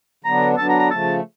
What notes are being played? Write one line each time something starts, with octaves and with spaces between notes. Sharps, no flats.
D3 F#3 B3 D4 A#5
D3 F#3 B3 D4 A5
A#5
A#5
C#3 F3 A3 A5